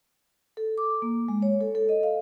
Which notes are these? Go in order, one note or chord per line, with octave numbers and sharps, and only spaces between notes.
A4
D6
A#3
G#3
C#5
A4
A4
D#5
F5